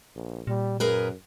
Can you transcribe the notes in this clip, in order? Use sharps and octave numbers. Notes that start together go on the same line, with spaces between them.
A#1
A#2 G3
F#2 G#4 A#4 B4